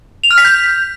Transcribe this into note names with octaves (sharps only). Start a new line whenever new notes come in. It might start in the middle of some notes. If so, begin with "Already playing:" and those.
F7
F6
B6
G6